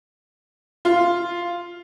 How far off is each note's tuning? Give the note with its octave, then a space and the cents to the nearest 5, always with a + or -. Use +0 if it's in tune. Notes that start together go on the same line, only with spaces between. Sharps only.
F4 -5